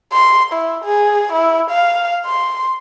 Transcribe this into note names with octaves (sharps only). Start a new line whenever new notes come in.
C6
E4
G#4
E4
F5
C6